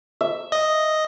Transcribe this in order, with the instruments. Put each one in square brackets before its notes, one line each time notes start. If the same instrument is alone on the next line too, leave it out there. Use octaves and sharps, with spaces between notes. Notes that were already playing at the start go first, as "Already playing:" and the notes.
[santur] E5
[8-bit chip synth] D#5